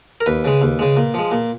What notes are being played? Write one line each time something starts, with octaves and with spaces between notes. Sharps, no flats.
A#4
D#2 B4
C#3 G#3
D#2
C#3 G#3
A#2
F3 G#3
A#2